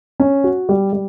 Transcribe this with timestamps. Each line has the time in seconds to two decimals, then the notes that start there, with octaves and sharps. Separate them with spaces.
0.20 C#4
0.44 F#4
0.69 G3
0.93 G3